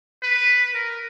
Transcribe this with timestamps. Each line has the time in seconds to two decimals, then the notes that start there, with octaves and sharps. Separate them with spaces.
0.23 B4
0.75 A#4